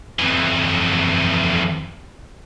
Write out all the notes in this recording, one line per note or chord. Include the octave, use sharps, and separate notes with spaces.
F2 E3